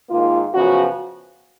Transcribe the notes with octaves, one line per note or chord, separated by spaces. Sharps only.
G#2 D#3 A#3 F4
F#2 C#3 F3 B3 F#4